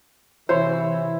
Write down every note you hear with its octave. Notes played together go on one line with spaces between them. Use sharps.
C3 E3 E4 C5 C#5